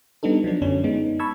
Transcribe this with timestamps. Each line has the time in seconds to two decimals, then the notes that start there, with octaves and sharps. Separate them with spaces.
0.23 G3 B3 D4 D#4 A4
0.44 F3 F#3 D4
0.62 F#2 D3 C#4 D4
0.84 G#3 B3 D#4
1.19 A5 B5 C#6 E6 G#6